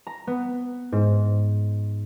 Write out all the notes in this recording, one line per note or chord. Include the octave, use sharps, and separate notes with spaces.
A#5
B3
G#2